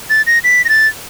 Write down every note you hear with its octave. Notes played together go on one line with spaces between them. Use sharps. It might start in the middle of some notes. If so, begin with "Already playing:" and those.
A6
A#6
B6
A#6
A6